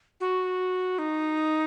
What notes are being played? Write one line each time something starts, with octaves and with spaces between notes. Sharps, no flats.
F#4
D#4